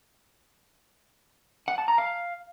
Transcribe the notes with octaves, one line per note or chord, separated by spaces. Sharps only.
F#5
A5
A#5
F5